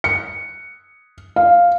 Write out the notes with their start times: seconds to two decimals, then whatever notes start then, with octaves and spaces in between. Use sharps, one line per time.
0.04 C#7
1.36 F5